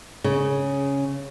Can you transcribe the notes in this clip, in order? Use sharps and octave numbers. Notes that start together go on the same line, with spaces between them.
C#3